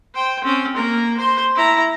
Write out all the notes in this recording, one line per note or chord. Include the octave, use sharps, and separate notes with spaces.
C5 G5
C4 C#4
A#3 A#4
C5 C6
E4 A#5